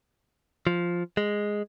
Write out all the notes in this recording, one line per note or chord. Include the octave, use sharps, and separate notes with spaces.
F3
G#3